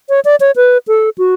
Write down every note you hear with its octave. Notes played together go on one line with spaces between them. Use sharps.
C#5
D5
C#5
B4
A4
F#4